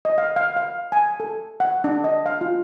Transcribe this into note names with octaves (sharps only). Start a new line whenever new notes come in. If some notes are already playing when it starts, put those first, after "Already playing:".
D#5
F5
F5
F5
G#5
A4
F#5
D4
D#5
F5
F4